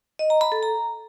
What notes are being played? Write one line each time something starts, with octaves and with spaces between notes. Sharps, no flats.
D#5
A#5
B5
A4
A#5